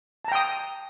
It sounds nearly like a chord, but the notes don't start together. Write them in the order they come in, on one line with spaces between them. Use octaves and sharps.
A5 A#5 G5 D#6